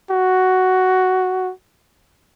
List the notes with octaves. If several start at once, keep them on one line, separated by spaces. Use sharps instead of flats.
F#4